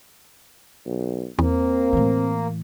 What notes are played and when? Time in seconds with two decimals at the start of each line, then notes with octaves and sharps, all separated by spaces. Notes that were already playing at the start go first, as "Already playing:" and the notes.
0.86 B1
1.39 E2 A#3 C4
1.93 A2 E3